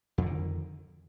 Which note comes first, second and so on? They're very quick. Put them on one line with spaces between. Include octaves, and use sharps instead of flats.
F2 D3 D#3